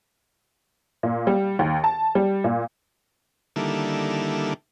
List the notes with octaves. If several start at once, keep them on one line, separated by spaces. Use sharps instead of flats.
A#2
G3
D#2
A5
G3
A#2
D3 D#3 G3 A#3 E4 A4